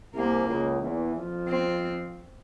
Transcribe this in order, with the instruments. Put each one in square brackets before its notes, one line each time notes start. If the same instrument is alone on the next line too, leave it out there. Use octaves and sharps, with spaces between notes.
[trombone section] C2 C3 [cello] A#3
[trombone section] C#2 C#3
E2 E3
F2 F3
[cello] C4